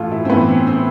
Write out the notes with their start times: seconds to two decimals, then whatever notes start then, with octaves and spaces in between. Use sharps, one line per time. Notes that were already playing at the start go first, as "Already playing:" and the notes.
Already playing: A2 E3 F4 A4
0.12 E4
0.25 C4
0.30 A2 E3 B3
0.48 C4
0.67 C4